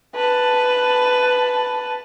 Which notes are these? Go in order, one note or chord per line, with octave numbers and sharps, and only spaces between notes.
B4 A5